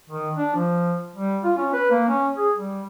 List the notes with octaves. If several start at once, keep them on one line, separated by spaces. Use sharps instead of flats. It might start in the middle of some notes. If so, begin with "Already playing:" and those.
D#3
D4
F3
G3
F4
C#4
B4
A#3
C#4
G#4
G3